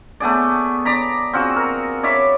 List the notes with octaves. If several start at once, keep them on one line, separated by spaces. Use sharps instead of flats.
A3 B3 G#4 D5
D5 A#5 B5
C4 F4 F#4 G#4
A#4
C#5 D5 E5 B5